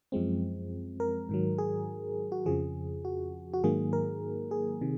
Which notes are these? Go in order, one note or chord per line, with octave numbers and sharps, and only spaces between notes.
F#2 F3 G#3 C4
A#4
G#2 D#3 F#3
G#4
F#4
F2 C#3 F3 G#4
F#4
F#4
G#2 D#3 F#3 A#3 G#4
A#4
G#4
C3 D#3